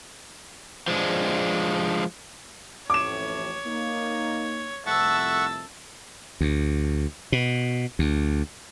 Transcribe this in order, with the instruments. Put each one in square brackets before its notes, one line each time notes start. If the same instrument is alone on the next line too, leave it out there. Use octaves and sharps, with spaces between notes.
[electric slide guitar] F3 G#3 D4
[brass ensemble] A1 F2 A2 [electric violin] C#5 [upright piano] D6 E7
[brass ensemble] A#3 D#4
[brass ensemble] C2 F2 A3 [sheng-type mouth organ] E5 F#5 C#6 [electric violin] A5 E6
[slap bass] D2
B2
D2